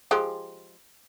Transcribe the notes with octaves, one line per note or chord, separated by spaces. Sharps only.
F3 G#3 G4